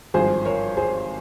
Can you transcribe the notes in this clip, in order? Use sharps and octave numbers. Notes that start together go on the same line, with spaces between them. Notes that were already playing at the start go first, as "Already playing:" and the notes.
G#1 G2 F3 G#4 C5
A#4 C#5
G#4 C5